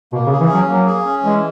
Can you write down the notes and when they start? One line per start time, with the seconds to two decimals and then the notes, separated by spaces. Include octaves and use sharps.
0.12 B2 A#3
0.26 C#3
0.31 G#4
0.40 E3
0.49 F#3 C#4
0.68 F#3 A#3
0.86 G#4
1.05 C#4
1.23 E3 G#3